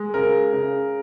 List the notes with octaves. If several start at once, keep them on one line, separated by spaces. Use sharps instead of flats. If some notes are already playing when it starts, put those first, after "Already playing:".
Already playing: G#3
C#3 A#4
C#3